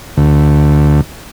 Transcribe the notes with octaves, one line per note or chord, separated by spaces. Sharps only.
D2